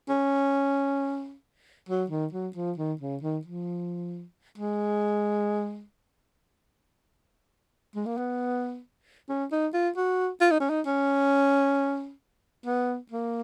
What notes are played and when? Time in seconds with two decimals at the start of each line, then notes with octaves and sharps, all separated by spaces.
0.09 C#4
1.89 F#3
2.10 D#3
2.33 F#3
2.56 F3
2.78 D#3
3.01 C#3
3.23 D#3
3.45 F3
4.58 G#3
7.95 G#3
8.06 A#3
8.17 B3
9.29 C#4
9.52 D#4
9.74 F4
9.97 F#4
10.41 F4
10.51 D#4
10.60 C#4
10.70 D#4
10.86 C#4
12.66 B3
13.12 A#3